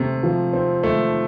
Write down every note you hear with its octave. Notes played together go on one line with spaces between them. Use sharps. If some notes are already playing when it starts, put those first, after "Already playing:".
Already playing: C3 A3 C4
F3
C4
A3